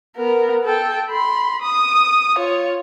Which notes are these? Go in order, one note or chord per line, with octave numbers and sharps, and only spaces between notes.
B3 A#4
A4 G5
B5 C6
D#6
F4 C#5